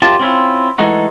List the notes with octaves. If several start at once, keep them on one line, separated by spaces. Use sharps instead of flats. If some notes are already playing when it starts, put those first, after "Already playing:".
F#2 F4 G4 A5
C4 C#4 E4 F4
E3 G#3 A3 D#4 F#4